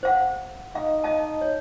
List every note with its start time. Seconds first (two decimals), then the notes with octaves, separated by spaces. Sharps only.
0.03 C5 F5 F#5
0.75 D#4 F5
1.04 D#5 F5 A5
1.41 C#5